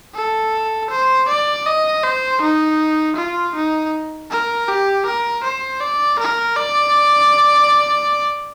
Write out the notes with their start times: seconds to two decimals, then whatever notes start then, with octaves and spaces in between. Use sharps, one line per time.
0.15 A4
0.90 C5
1.29 D5
1.66 D#5
2.03 C5
2.42 D#4
3.16 F4
3.55 D#4
4.31 A#4
4.68 G4
5.06 A#4
5.44 C5
5.81 D5
6.19 A#4
6.56 D5